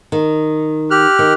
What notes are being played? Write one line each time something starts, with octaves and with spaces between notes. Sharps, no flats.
D#3
G4 F6 F#6
D#3